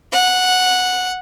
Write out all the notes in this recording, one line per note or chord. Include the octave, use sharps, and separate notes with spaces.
F#5